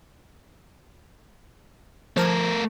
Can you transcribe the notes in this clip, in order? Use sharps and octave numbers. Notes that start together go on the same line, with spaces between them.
F3 A3 A#4 A5 G#6